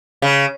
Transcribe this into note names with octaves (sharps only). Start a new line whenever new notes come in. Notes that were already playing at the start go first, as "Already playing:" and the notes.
C#3